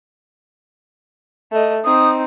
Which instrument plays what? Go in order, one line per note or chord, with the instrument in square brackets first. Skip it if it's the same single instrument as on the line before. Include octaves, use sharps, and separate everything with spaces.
[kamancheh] A3 D#5
[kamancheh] C4 D#4 [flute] D#6